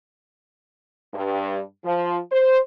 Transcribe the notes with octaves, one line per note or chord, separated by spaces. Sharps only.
G2
F3
C5